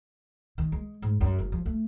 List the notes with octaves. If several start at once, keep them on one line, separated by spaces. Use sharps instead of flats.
D#3
G#3
G#2
F#2
F#1
F3
A3